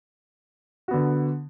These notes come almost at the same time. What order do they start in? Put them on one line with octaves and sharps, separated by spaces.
F#4 B3 D3